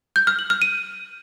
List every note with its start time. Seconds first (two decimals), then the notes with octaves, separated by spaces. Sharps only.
0.16 G6
0.27 F6
0.39 F#7
0.50 F6
0.62 D#7